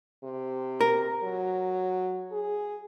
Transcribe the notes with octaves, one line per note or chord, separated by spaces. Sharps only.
C3
A#4
F#3
G#4